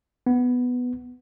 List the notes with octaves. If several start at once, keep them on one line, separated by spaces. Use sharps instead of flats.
B3